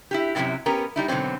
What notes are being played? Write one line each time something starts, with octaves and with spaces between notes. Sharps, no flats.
E4 F#4 G4
F#2 C3 F#3 G3 E4 G5
B3 C#4 G4 A#4
G3 D#4 E4
G#2 B2 D3 F#3 C4